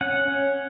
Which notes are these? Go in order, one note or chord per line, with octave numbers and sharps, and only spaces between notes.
C#4 F#5
C#4